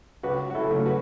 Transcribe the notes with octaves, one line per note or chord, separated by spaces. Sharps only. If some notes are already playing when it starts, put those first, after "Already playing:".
C#2 F#4 B4
F#4
E4 A4
C#3 F#3 A3
F#4 B4